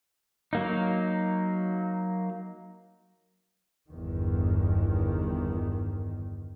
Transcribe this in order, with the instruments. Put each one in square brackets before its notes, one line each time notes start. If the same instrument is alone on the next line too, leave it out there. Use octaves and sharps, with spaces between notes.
[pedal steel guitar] F#3 A#3 D#4
[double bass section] G1 E2 D#3